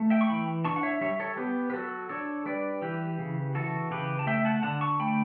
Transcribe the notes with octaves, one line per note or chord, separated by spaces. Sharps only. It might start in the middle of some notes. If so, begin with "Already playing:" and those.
Already playing: A3
E5 G5
C#6
E3 G5 B5
D4 A5 C#6
F#5
C#5 E5
G3 C#5 E5
A4 C#5
B3 G4 B4
B4
F#3 F#4 A4
D4 A4 C#5
G3 B4 D5
E3 G4 B4
C#3
E3 F#4 A4
C#3 G4 B4
A5
A3 E5 G5
F#5 A5
D3 F#5 A5
A5 C#6
A3 G5 B5